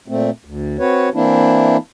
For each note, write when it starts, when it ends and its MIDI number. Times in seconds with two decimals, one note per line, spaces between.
0.08 0.30 46
0.08 0.30 57
0.08 0.30 60
0.45 0.77 38
0.79 1.09 60
0.79 1.09 66
0.79 1.09 71
0.79 1.09 73
1.14 1.77 52
1.14 1.77 58
1.14 1.77 60
1.14 1.77 62
1.14 1.77 64